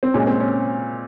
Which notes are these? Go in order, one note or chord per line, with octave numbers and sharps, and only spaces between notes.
C4
A#2 G#3 C#4
C4
C#4